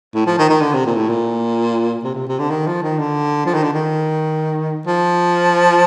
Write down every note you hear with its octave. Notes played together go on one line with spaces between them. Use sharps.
A2
F3
D#3
D#3
D3
C3
A#2
A2
A#2
C3
C3
C3
D3
D#3
F3
D#3
D3
F3
D#3
D3
D#3
F3